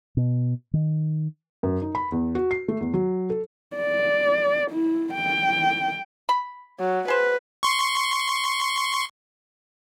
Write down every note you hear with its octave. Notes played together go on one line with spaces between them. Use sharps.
B2
D#3
F#2
D#4
B5
E2
F#4
C7
A3
E2
F#3
A4
D5
E4
G5
B5
F#3
G#4 B4 C5
C6 C#6